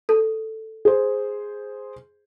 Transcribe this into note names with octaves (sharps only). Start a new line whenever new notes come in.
A4
G#4 C5